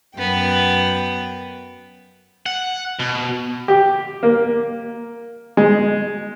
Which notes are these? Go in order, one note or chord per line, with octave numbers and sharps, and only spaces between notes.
F#2 B3 G5
F#5
B2
G4
A#3
G#3